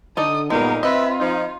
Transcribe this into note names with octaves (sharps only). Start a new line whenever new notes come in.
D3 D#4 A4 D5 D#6
G2 A#2 D3 G3 G#3 B3 D#4 A#4
C4 F4 B4 D#5 E5
F3 D#4